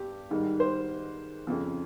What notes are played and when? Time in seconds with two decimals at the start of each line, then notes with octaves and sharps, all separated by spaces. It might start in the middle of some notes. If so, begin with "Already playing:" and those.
Already playing: G2 G4
0.31 G#2 D#3 G3
0.60 C5
1.47 F2 C#3 F3